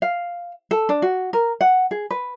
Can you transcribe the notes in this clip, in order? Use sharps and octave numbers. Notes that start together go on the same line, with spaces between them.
F5
A4
D4
F#4
A#4
F#5
G#4
B4